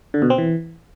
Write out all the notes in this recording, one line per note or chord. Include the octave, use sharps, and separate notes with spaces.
D3
B2
C4
E3